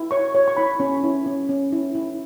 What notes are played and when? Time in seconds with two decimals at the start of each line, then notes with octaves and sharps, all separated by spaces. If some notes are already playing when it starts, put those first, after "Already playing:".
Already playing: E4
0.11 C#5 C#6
0.35 C#5
0.48 C#6
0.57 E4 B5
0.80 C#4
1.03 E4
1.26 C#4
1.49 C#4
1.73 E4
1.95 E4